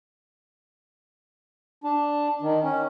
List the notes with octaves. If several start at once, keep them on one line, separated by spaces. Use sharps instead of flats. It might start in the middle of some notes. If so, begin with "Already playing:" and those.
D4
D#3
C#4